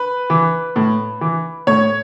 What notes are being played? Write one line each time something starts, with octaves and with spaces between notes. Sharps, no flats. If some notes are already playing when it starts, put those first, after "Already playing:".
Already playing: B4
E3
A2
E3
A2 C#5